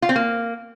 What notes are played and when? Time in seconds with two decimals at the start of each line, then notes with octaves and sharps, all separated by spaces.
0.02 F4
0.09 C4
0.16 A#3